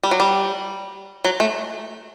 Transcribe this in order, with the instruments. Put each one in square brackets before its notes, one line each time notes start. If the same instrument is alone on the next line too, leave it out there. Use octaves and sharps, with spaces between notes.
[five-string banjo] G3
F#3
G3
F#3
A3